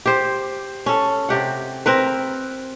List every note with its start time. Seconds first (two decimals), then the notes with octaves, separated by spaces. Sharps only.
0.06 G4 C5
0.86 C#4 A4
1.29 C3 G4 F#5
1.86 C4 A#4 B4